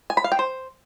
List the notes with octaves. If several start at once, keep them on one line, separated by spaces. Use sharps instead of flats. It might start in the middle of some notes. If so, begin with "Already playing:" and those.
G#5
B5
F5
G5
C5